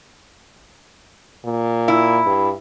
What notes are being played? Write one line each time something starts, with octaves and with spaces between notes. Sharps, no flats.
A#2
E4
G2